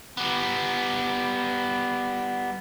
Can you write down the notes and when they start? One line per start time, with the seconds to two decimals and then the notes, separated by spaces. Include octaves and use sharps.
0.17 G3 B3